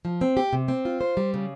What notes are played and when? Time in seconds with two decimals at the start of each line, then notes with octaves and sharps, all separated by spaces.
0.05 F3
0.21 C4
0.37 G4
0.53 C3
0.68 C4
0.85 F4
1.01 C5
1.17 G3
1.34 C#3